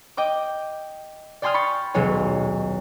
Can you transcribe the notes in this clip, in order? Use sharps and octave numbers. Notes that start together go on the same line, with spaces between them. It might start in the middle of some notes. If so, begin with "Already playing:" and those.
D#5 G5 D6
D5 G5 G#5 C6 D#6 F6
B5 C#6 A6 C#7
D#1 B1 F#3 G#3 C#5 G#5